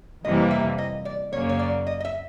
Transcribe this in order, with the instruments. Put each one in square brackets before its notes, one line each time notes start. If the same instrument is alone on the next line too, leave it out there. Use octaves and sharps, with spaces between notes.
[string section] F2 C3 E3 G3 A#3 [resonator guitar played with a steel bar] D#5
[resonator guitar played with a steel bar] E5
D#5
D5
[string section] F#2 C#3 F#3 A#3 [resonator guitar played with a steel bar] C#5
[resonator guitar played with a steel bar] C#5
D5
D#5
D#5
E5